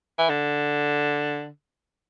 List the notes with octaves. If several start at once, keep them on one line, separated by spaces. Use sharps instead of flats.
E3
D3